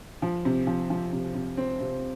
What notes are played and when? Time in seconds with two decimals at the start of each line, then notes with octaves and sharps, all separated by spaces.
0.22 F3
0.45 C3
0.67 F3
0.90 F3
1.12 C3
1.34 C3
1.57 C4
1.80 C3